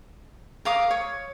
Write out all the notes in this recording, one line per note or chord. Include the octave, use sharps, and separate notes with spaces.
A#4 F5 D6 D#6
C#5